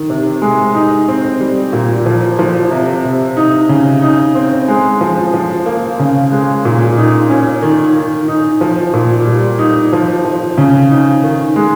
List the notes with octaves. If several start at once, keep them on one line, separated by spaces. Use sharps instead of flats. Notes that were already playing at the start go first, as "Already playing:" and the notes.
Already playing: D#3
C3
G#3
D#4
C4
G3
A#2
F3
F3
C3
C3
D#4
C#3
D#4
C4
G#3
F3
F3
A#3
C#3
G#3
A#2
D#4
C#4
D#3
D#3
D#4
F3
A#2
G3
D#4
F3
F3
C#3
D#4
D#3
G#3